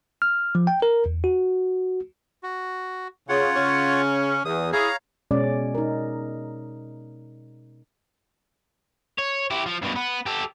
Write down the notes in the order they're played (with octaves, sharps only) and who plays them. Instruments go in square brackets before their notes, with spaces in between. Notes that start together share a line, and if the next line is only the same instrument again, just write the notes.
[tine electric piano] F6
F3
G5
A#4
E2
F#4
[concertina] F#4
[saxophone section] C#3 [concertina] F4 C#5 F#5
[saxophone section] C#3 C#4
[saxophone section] E2 [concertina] D#6
[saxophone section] E4 G#4 [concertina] C#5 F5 A#5
[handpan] B2 G#3 C#4 D5
D#4 A#4
[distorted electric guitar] C#5
E4 G4
F3
G2 B2
B3
G4 A4